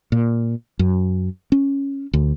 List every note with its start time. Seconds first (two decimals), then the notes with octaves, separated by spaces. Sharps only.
0.12 A#2
0.79 F#2
1.52 C#4
2.13 D2